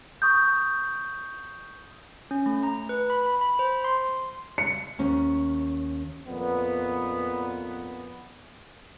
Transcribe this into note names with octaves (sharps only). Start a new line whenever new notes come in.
C#6 D#6 G6
C#4
A3
A#5
B4
B5
B5
B5
C5
C6
C#7
D#2 C#4
F2 A#2 B3